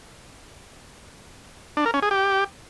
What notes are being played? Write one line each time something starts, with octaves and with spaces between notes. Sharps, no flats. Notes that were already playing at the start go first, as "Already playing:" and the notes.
D4
A#4
C#4
G#4
G4